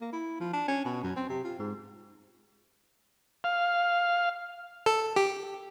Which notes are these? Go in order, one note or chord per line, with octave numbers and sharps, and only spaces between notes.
A#3
E4
F3
D4
C#4
B2
F#2
C4
C3
F4
G#2
F5
A4
G4